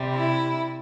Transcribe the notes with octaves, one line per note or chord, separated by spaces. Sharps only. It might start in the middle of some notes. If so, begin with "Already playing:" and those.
Already playing: C3 G3
E4